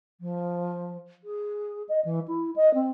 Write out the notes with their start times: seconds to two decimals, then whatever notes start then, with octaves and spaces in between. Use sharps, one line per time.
0.20 F3
1.24 G#4
1.88 D#5
2.04 E3
2.27 E4
2.56 D#5
2.74 C4